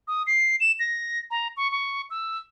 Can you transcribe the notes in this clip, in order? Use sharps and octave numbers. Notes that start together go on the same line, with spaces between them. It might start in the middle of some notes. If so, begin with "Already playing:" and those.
D#6
C7
E7
A#6
A#5
C#6
C#6
E6